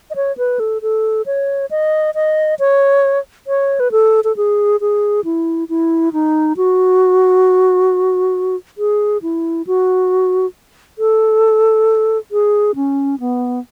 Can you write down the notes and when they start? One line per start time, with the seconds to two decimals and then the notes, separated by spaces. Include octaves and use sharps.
0.11 D#5
0.16 C#5
0.38 B4
0.60 A4
0.82 A4
1.26 C#5
1.71 D#5
2.15 D#5
2.59 C#5
3.47 C#5
3.80 B4
3.92 A4
4.24 A4
4.37 G#4
4.81 G#4
5.25 E4
5.69 E4
6.13 D#4
6.57 F#4
8.78 G#4
9.22 E4
9.67 F#4
10.99 A4
12.32 G#4
12.76 C#4
13.20 B3